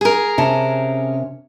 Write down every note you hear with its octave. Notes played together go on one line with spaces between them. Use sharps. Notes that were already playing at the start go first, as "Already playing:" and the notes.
G#4 A#4
C3 C#4 A5